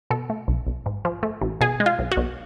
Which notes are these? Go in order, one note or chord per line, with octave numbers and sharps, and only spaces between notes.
B2 A4
A3
B1
B1
G#2
F3
A3
A1
B2 G#4
G#3
F4
B1
F#4
B1